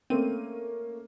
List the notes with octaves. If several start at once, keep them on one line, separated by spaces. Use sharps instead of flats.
A3 A#3 C4 C#4 D#7